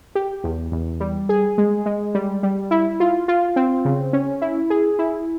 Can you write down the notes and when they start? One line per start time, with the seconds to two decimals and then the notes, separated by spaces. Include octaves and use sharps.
0.15 G4
0.44 E2
0.72 E2
1.00 G3
1.29 G#4
1.58 G#3
1.86 G#3
2.15 G3
2.43 G3
2.71 E4
3.00 F4
3.28 F4
3.56 C4
3.85 C#3
4.13 C#4
4.42 E4
4.70 G#4
4.99 E4